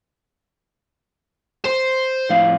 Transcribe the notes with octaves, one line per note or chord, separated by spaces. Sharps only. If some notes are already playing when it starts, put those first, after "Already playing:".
C5
F2 A2 F5